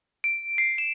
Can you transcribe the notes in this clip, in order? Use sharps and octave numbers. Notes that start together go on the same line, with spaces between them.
D7
C7
E7